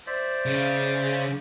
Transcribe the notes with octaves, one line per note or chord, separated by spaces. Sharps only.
C5 D5 E5
C#3